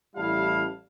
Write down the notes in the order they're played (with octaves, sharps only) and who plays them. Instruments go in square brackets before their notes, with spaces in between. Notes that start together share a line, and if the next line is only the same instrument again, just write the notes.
[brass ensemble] A1 G3 E4 F5 A5